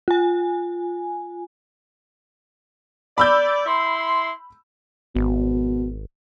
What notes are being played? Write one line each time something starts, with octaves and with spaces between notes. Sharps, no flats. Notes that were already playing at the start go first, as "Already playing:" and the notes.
F4 G#5
D5 B5 E6 G6
E4 C6
G#1 B2